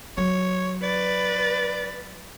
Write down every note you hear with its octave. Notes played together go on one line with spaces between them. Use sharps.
F#3 C#5
B4 D5 A6